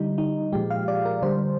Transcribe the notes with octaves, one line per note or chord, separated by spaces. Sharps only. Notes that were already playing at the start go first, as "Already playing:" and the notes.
Already playing: D3 G3 D#4
D#4
A#2 F3 G#3 G4
F5
D5
A#4
D3 G3 C5